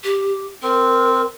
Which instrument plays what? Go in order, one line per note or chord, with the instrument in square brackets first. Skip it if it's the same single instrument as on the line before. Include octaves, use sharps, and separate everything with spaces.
[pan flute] G4
[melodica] C4 [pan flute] A#4